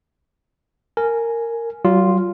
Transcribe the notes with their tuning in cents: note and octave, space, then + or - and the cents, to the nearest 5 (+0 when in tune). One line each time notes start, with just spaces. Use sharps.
A#4 -15 G#5 +10
F#3 +40 F4 +0